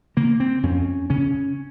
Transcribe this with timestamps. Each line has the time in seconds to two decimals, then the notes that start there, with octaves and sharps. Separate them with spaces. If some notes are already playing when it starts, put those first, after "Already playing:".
0.17 C#3 A#3
0.40 C4
0.63 F2 C#4
1.10 C#3 C#4